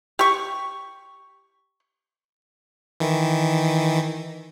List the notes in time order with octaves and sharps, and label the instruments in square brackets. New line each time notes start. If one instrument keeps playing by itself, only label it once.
[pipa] G4 C#6
[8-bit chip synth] D#3 E3